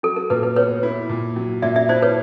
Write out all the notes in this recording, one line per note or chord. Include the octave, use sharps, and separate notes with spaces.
F#3 A4
A#4
A#2 B4
B4
B3 B4 C#5
E4
A#2
F#3
A#2 D5 E5
D5 E5
E4 C5 D5
B4 C#5